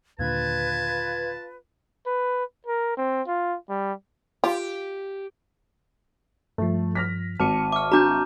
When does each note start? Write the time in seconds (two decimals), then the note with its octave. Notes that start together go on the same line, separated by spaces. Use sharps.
0.19 D#2 A#2 D3 F4 B4 A5 G#6
2.06 B4
2.67 A#4
2.97 C4
3.27 F4
3.70 G3
4.44 F4 G4
6.58 G2 F3 A3
6.95 F6 A#6 B6
7.40 G#1 A5 D6 F6 C#7 D#7
7.72 E5 C#6 D6 F6
7.92 D4 F#4 A#5 D6 G6